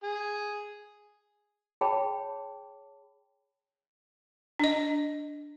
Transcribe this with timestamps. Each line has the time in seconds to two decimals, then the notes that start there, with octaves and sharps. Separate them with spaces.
0.04 G#4
1.81 G#4 C#5 G5 A5 B5
4.59 D4 D#5